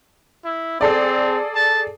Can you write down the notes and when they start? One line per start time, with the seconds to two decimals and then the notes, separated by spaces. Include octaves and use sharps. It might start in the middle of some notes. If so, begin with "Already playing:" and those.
0.45 E4
0.81 C4 G#4 A4 D5
1.55 A5